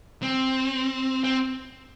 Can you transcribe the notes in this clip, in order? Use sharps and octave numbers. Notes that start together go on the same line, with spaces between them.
C4
C4